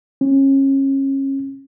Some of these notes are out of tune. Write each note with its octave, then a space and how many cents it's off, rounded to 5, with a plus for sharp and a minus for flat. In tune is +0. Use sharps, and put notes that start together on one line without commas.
C#4 -30